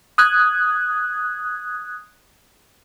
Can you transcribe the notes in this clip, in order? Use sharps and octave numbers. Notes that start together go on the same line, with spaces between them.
D#6 F#6 G#6